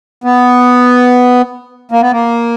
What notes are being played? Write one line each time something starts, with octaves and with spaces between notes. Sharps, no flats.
B3
A#3
B3
A#3